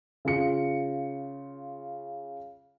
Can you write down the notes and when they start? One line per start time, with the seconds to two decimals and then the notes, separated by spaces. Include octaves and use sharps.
0.25 C#3 F4 C#7